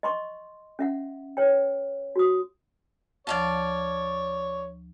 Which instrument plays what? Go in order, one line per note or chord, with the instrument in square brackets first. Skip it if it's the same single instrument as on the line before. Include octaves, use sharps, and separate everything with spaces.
[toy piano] D#5 C6 C#6
C#4 E5 F#5
B4 C#5 G5
F#4 D#6
[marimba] D2 F3 [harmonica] C#5 [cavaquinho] D5 F5 A5